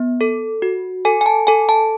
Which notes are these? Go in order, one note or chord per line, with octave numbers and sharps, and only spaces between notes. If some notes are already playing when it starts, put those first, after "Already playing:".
Already playing: B3
A4
F#4
A4 G#5
G#5
A5
A4 G#5
A5